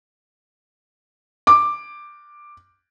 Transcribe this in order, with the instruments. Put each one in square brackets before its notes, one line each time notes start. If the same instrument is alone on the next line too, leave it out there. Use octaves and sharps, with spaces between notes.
[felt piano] D6